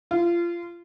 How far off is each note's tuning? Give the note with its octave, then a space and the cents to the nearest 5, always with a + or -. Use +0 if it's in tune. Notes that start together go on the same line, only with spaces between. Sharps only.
F4 -25